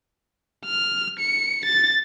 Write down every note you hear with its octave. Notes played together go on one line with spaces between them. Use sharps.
F6
C#7
A6